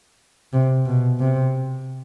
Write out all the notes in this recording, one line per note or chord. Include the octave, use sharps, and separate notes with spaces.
C3
B2
C3